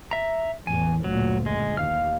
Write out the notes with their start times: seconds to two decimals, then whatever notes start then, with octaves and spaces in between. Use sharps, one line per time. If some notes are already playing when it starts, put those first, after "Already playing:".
0.11 E5 A#5
0.67 A1 E2 G#5
1.04 F#1 D2 A#2 F#3
1.46 G#3
1.77 D#2 F5 F6